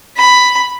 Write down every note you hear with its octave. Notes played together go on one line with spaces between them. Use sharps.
B5